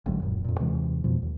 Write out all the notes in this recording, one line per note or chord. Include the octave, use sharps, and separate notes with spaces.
A1 D2 G#2 F#3
D#1 F#2 A#2
F2 A#2
D#2 C3 E3 G#3
F2 B2 F3
D#2